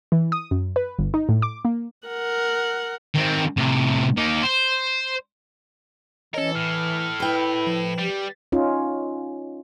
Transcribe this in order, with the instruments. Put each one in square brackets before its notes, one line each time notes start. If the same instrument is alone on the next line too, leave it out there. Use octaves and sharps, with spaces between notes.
[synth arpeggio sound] E3
D#6
F#2
B4
G1
D#4
A2
D6
A#3
[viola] A#4 F#5
[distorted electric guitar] D#3 C4
A2 C3
A#3 D#4
C5
[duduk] E3 [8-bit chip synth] C#4 C#5 D#5 [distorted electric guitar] A4 A#4
[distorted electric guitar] A2 [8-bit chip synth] F6
[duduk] E4 [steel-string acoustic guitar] B4 G5
[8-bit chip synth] F3
[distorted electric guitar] G3 [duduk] G4
[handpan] C#4 D#4 F4